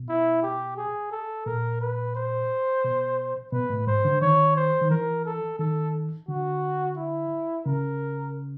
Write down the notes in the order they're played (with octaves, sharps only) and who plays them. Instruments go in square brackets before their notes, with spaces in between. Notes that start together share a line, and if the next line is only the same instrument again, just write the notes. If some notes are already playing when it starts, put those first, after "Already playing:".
Already playing: [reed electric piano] B2
[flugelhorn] E4
G4
G#4
A4
[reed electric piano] A#2 [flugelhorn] A#4
[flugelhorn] B4
C5
[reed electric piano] B2
[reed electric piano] B2 [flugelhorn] B4
[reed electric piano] A2
[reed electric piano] G#2 [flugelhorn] C5
[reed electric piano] D3
[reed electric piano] D#3 [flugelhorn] C#5
[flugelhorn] C5
[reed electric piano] D#3
[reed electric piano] E3 [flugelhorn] A#4
[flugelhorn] A4
[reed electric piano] D#3 [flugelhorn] A4
[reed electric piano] D3 [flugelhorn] F#4
[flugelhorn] E4
[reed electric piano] C#3 [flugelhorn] A#4